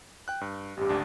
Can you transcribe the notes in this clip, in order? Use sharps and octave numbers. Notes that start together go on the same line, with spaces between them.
G5 F#6
G2
A1 G2 G4
G#1 D2 D4